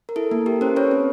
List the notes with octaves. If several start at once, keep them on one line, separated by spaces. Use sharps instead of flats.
A#4
E4 A4
A#3 A4
G4 A#4
C#4 A#4 C5
A4 B4 C#5
C4